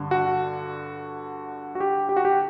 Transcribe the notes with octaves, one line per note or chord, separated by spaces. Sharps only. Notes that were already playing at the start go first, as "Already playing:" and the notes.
Already playing: G2 D3
F#4
F#4
G4
G4
F#4
G4